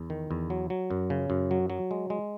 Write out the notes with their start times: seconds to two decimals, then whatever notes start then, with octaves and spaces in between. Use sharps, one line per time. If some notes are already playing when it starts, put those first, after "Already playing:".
Already playing: E2
0.10 D#3
0.31 E2
0.50 F#3
0.70 F#3
0.90 F#2
1.10 C#3
1.30 F#2
1.51 F#3
1.70 F#3
1.91 G#3
2.10 G#3